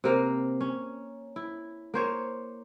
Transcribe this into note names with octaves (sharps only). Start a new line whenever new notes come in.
C3 A#3 F5
C#4
E4
A#3 C5 C#5